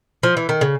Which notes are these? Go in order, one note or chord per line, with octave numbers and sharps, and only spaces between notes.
F3
E3
D#3
C#3